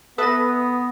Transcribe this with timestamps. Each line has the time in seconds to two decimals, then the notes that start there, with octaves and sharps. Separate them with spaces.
0.18 B3 A4 B4 E5 D#6 A#6